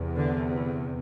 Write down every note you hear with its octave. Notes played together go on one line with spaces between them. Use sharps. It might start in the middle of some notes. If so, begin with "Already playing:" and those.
Already playing: E2 C3
D3